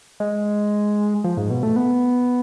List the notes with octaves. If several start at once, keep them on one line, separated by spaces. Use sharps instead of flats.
G#3
F3
G#2
B2
A3
B3